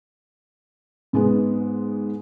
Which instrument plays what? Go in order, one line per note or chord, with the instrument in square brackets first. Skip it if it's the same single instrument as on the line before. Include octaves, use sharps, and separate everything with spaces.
[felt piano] G#2 G#3 B3